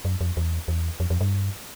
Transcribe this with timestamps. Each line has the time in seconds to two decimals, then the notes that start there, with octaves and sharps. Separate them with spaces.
0.05 F#2
0.21 F2
0.37 E2
0.68 E2
1.00 F2
1.10 F2
1.21 G2